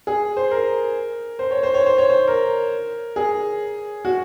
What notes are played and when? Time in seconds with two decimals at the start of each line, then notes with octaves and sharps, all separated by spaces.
0.07 G#4
0.37 C5
0.51 A#4
1.39 C5
1.51 C#5
1.63 C5
1.74 C#5
1.86 C5
1.98 C#5
2.10 C5
2.28 A#4
3.16 G#4
4.05 F#4